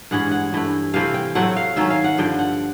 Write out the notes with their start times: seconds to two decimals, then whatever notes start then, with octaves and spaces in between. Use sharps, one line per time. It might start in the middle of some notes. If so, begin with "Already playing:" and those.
0.11 G2 E3 G#3 C#4 F#5
0.31 F#5
0.53 G2 E3 A3
0.94 C3 E3 A3 C4 F5
1.14 G5
1.35 A2 F#3 A3 C4 F#5
1.57 F5
1.76 D#3 F#3 A3 C#4 E5
1.90 F5
2.04 F#5
2.18 G2 D3 F3 G5
2.39 F#5